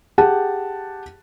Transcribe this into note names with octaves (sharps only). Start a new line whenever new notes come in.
G4 G#4 F#5 A5